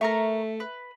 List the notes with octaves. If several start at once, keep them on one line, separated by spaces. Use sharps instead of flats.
A3 A#4 E5 A#5 C#6
B4